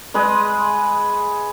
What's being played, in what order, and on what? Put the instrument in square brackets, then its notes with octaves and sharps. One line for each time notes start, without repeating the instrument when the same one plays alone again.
[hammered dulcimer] G#3 B4 D#5